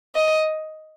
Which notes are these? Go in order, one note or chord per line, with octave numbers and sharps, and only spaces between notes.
D#5